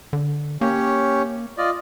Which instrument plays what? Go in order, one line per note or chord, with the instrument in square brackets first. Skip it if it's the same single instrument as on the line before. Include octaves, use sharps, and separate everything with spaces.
[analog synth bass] D3
[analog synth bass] A#3 [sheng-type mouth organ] C#4 G4 C#5
[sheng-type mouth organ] F4 D5 D#5